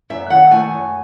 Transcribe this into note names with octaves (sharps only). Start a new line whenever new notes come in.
F#2 E5
D#3 F#5
A3 G#5
F#2